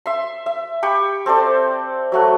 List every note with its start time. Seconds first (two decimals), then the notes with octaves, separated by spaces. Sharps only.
0.06 E5 C6
0.46 E5
0.82 G4 G5 B5 C#6
1.26 C4 A4 C5 D5
2.12 F#3 A3 F#5